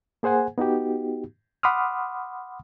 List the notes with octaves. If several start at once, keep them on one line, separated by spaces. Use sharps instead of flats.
A#3 G#4 C5 F#5 G#5
B3 D#4 F#4 G4
F#5 B5 C6 D6 D#6 F6